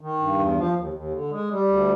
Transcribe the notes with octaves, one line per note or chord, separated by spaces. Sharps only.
D#3
G2
E2
F3
D#2
D#2
D3
G#3
G3
D2